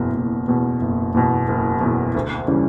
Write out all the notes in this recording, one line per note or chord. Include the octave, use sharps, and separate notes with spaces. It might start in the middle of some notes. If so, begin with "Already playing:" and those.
Already playing: F#1 E2 B2
F#1
E2 B2
F#1
E2 B2
F#1
E2 B2
D2
C#3 E3 G3